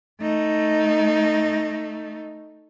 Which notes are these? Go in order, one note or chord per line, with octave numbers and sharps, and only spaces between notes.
A3 D#4